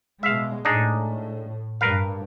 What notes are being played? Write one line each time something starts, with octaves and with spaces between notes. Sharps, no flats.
B2 G#3 E5 F5
A2 D4 D#4 G#4
G2 A#4 B4 F5